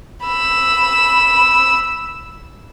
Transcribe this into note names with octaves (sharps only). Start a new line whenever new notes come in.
B5 E6